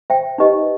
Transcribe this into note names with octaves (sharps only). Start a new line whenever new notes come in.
C5 E5 G5
D#4 G4 B4 D#5